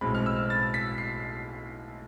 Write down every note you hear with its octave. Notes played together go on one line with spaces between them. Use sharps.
B1 A2 G#3 C4 B5
F6
E6
A6
B6
C7